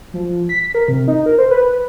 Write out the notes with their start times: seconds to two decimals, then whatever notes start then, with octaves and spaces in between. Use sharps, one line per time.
0.14 F3
0.49 B6
0.75 A#4
0.88 C3
1.08 D#4
1.26 A#4
1.38 C5
1.51 B4